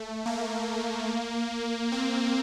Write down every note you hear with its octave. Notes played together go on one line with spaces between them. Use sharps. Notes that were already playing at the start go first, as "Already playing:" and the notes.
Already playing: A3
A#3
C4